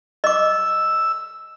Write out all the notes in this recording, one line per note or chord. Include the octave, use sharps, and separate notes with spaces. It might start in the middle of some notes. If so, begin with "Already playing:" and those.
D#5 D6 E6